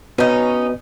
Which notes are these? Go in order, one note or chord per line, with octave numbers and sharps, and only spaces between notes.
B3 C#4 D#4 F#4 B4